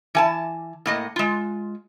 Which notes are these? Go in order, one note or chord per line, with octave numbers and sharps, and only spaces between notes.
E3 G#5 A5
A2 A#3 D#5
G#3 F4